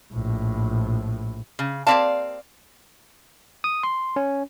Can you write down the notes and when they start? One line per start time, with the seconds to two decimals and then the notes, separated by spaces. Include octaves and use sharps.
0.13 A#1 A2
1.59 C#3
1.87 A#3 C4 G4 D5 F5 A5
3.64 D#6
3.83 C6
4.16 C#4